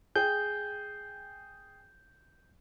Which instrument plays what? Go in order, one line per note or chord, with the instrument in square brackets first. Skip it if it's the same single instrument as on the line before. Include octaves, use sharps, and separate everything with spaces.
[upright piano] G#4 G5 [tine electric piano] G6